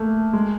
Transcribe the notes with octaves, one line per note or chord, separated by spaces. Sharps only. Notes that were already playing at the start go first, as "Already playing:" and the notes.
Already playing: A3 A#3
G#3